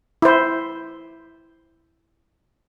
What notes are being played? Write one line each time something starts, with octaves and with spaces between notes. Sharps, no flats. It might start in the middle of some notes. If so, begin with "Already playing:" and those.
E4 C5